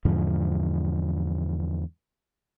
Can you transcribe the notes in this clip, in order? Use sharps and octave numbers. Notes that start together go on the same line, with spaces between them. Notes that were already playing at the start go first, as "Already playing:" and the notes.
E2 G#2 D3 F3